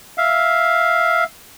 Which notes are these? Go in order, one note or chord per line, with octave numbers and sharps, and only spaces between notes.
E5 F5